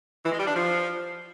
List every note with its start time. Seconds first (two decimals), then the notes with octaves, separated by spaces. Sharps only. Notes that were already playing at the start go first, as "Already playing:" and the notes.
0.24 E3
0.31 G#3
0.39 G3
0.47 D4
0.54 F3